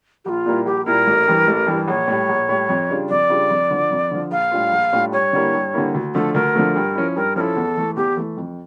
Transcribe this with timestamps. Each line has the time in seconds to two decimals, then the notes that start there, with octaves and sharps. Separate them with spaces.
0.25 A#1 F4 G4
0.46 A#2 G3 A#3 E4
0.66 A#1 G4
0.86 A#2 G3 A#3 E4 A#4
1.07 A1
1.27 G2 E3
1.47 A1
1.67 G2 E3
1.88 A#1 C#5
2.07 A2 G3
2.29 A#1
2.49 A2 G3
2.69 F2
2.90 C#3 G3 D4 F4
3.09 F2 D5
3.29 C#3 G3 D4 F4
3.50 F2
3.71 D3 F3
3.91 F2
4.11 D3 F3
4.31 A#1 F5
4.51 A2 G3 D4 F4
4.72 A#1
4.92 A2 G3 D4 F4
5.12 G2 C#5
5.33 D3 G3 A#3 E4
5.54 G2
5.74 D3 G3 A#3 E4
5.94 D2
6.14 D3 F3 A3 A4
6.34 D2 A#4
6.55 D3 F3 A3
6.76 G2
6.95 F3 C#4 E4
7.15 G2 A#4
7.36 F3 C#4 E4 A4 A#4
7.56 E2
7.77 E3 A3
7.96 E2 G4
8.17 E3 A3
8.37 F2